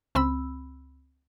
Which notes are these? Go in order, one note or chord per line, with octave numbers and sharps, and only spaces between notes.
C#2 C4 B5 E6